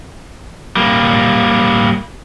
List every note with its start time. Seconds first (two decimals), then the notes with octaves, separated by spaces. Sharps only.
0.77 G3 A#3